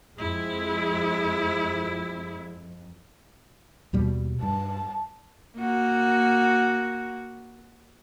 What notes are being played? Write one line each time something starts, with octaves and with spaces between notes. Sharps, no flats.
F2 G#3 E4
D#2 B2 G3
G2 A5
A#3 F#4